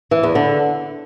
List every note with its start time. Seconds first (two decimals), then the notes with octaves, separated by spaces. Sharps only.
0.11 E3
0.23 E2
0.35 D3